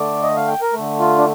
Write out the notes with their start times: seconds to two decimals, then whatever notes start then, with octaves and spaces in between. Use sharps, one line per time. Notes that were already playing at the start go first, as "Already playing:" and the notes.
Already playing: D3 A3 D5
0.23 D#5
0.36 F5
0.48 G5
0.61 A#4
0.73 D3 A3
1.00 F4
1.18 D4